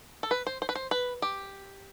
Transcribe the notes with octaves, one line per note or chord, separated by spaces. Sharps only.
A4
B4
C5
C5
B4
C5
B4
G4